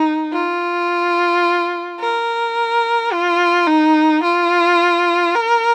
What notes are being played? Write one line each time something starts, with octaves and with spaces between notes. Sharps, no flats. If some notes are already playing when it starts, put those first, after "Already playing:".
Already playing: D#4
F4
A#4
F4
D#4
F4
A#4